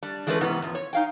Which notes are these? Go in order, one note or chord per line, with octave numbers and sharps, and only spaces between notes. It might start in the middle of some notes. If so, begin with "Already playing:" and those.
G3 D4
E3 G#3 A3 C#4 A4 B4
G#2 C3 E3 B3 C#4
E2 F3
C#5
D#4 F5 G5